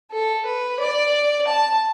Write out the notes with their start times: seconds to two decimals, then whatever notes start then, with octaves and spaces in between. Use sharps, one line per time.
0.11 A4
0.46 B4
0.80 D5
1.46 A5